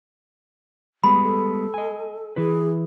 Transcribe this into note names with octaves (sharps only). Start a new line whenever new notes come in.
G3 G#3 B3 B5
A4
D#5 G#5
E3 E4 G#4 B4